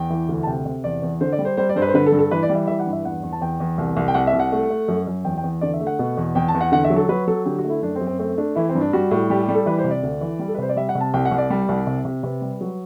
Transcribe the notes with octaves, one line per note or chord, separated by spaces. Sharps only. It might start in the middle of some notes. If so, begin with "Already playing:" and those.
Already playing: E2 G5
E3
D2
A5
C3 G5
C3
E2 D5
E2
D3 C5
D5
G3
C5
G3 C5
D5
G2 C5
B4
C5
D3 B4
A4
G2
A4
E3 B4
D5
G3
E5
E3 E5
F#5
G2
E5
E2 F#5
E2
A5
E2 G5
E2
C2
C2
G5
C2 F#5
E5
C2
F#5
A3
A3
F#2
F#2
E2 G5
G5
E2
D3 D5
E5
A3
F#5
B2
E2
E2 G5
A5
E2
F#5
D3 F#5
E5
F#3
A4
F#3 B4
F#3 A4
D3 G4
F#4
A3
E4
F#2 D4
C4
F#2
C4
A3 C4
A3 D4
E3 E4
C4
G2
D4
G3 F#4
A2
G3 G4
G4
G3
A4
E3 B4
C5
C3
D5
D2
E3
G3
A4
B4
C3 C5
D5
G3 E5
F#5
C3
A5
C2 G5
F#5
C2
D5
G3
C2
C3
C3
C3 B4
G3
F#3